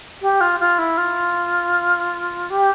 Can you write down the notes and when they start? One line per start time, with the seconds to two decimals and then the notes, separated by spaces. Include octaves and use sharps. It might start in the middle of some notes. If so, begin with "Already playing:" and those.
0.21 G4
0.40 F4
0.59 F4
0.78 E4
0.97 F4
2.50 G4